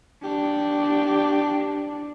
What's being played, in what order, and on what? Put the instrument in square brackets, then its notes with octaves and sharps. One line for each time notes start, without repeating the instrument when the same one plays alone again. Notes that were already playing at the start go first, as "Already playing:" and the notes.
[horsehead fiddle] D4 [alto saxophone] G4